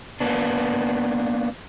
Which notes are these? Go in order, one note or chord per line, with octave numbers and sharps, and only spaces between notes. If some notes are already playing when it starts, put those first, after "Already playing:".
A#3 B3 D4